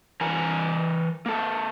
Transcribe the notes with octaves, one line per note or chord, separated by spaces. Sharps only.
E3 A#4 G#5 A#5
A#3 A4